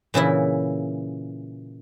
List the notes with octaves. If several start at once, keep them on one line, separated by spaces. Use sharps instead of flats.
A#2 C#3 E3 E4